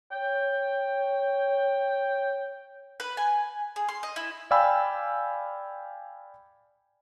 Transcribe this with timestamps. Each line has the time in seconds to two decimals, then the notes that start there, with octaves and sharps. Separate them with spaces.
0.12 C#5 G5
3.00 B4
3.17 G#5
3.76 G#4
3.89 C6
4.03 D#5
4.16 E4
4.51 D5 F5 G5 G#5 B5 E6